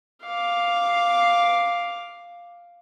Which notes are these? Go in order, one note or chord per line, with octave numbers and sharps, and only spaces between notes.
F5 D6